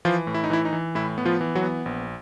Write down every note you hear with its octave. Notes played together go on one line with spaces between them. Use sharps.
E3 F3 F4
A2
E4
D#4
E3 E4
D#4
E3
A2 E4
B3
F3 F4
E3
F#3 F#4
B3
A#1